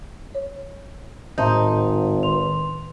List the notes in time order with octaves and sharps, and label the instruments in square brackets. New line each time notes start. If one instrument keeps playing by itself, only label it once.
[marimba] C#5
[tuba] G#1 [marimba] A2 E5 G6 [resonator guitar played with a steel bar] D#4 [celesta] C5 A5 C6
[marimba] D#3 [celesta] B4 C6 F7